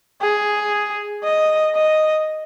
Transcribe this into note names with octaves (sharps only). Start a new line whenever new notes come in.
G#4
D#5
D#5